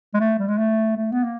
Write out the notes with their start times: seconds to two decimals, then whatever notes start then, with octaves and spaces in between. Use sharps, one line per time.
0.14 G#3
0.20 A3
0.39 G3
0.48 G#3
0.58 A3
0.97 A3
1.12 B3
1.24 A#3